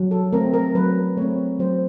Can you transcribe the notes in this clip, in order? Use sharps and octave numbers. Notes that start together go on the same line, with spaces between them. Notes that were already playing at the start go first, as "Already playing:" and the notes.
Already playing: F#3
A4
A3 C4 A#4
A#4
F#3 B4
A3 C4 C#5
F#3 C5